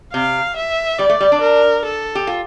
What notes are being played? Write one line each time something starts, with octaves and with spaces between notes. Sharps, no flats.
C3 F5
E5
G3 D5
A3
G3
D4
A#4
A4
G4
F4